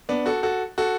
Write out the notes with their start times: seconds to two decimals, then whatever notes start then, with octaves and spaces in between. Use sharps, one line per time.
0.09 B3 D4
0.26 F#4 A4
0.43 F#4 A4
0.78 F#4 A4